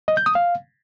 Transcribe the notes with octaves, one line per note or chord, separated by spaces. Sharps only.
D#5
G6
D#6
F5